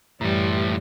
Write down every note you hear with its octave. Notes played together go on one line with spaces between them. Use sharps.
F#2 A2 E3 G3